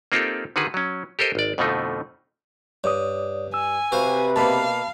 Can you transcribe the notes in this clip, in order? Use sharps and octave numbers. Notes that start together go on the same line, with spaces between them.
A#3 C4 D#4 F4 G4 A4
D3 D#3 F#4 G#4 B4
F#3 C#4
G4 A4 A#4 C5 D#5
G#1 D5
F2 B2 D3 F3 A3 D#4
G2 C#5 D5 D#6
G#5 E6
C3 F#4 B4 C5 F5
B2 A#3 F5 A5 B5